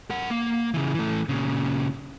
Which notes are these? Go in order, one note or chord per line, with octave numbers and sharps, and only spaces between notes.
A#4 F#5
A#3
C#3 E3
E3 A3
A#2 C#3